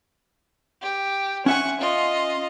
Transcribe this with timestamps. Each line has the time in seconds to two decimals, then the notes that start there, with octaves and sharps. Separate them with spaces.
0.82 G4
1.46 C#4 E5 F#5 G#5 C#6
1.81 F4 D#5